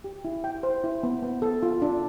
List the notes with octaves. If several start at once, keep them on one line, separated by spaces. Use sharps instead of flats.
G4
E4
G5
C5
E4
B3
B3
A4
F4
D4